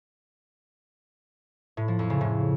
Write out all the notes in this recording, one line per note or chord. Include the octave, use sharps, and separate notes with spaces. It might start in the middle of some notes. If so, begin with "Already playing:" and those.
A2
F3
F2
C#3
A2